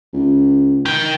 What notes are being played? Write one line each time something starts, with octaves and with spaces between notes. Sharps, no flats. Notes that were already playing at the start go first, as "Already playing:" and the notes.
C#2
D#3 G5